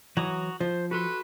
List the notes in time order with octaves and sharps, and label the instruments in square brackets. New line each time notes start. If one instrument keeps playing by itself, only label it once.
[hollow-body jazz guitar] E3 F#3 [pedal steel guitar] F#4 A#5 D#6
[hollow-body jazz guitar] F3 [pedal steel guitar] C5
[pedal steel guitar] F#4 A4 C6 [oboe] B4